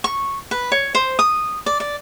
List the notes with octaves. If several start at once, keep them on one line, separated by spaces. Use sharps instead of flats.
C#6
B4
C#5
C5
D#6
D5
D5